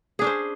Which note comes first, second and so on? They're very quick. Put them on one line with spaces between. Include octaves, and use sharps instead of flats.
G#4 D4 C#4 C5